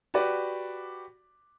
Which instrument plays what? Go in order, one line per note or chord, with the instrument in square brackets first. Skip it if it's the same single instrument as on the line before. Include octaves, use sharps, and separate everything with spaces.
[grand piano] F#4 G4 B4 D5